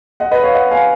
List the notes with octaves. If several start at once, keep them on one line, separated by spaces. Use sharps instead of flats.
D#5 F#5
B4 D#5
C#5 F5
D#5 F#5
F5 G#5